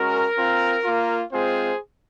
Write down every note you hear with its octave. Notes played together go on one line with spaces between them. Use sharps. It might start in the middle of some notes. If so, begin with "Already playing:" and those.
Already playing: G#3 C#4 F#4 A#4
C4 F4
A#3 F4
G#3 C4 F4 G#4 C5